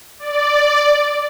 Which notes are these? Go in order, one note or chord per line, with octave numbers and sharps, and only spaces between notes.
D5